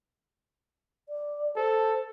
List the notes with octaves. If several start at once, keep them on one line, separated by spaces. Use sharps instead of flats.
D5
A4 C5